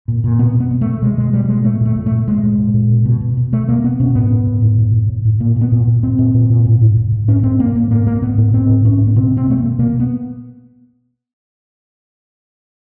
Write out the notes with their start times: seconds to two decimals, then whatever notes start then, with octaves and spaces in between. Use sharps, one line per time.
0.08 A#2
0.24 A#2
0.39 B2 B3
0.55 B2
0.60 B3
0.71 B2
0.81 A3
0.86 B2
1.02 B2 G#3
1.18 B2 G#3
1.33 B2 G3
1.45 G3
1.49 B2 G#3
1.64 A#2 A3
1.81 A#2 A3
1.96 A#2
2.06 A3
2.11 A#2
2.27 A#2 G#3
2.43 A#2
2.58 A#2
2.74 A#2
2.90 B2
3.05 B2
3.21 B2
3.37 B2
3.52 B2 A3
3.68 B2 A#3
3.84 B2 B3
4.00 B2 C#4
4.15 A2 B3
4.31 A2
4.47 A2
4.62 A2
4.78 A2
4.94 A2
5.09 A2
5.25 A2
5.40 A#2 A#3
5.56 A#2
5.61 B3
5.72 A#2
5.87 A#2
6.03 A#2 C4
6.19 A#2
6.34 A#2
6.50 A#2
6.66 A2
6.81 A2
6.97 A2
7.12 A2
7.28 A2 C#4
7.43 A2 C4
7.59 A2 A#3
7.75 A2 A#3
7.91 A2 A#3
8.07 A2 A#3
8.22 A2 B3
8.38 A2 B3
8.53 A2 C4
8.69 A2
8.85 A2 C#4
9.01 A2
9.07 B3
9.16 B2 C4
9.32 B2
9.37 C4
9.47 B2 A3
9.58 A#3
9.63 B2
9.79 B2 A#3
9.94 B2
10.00 B3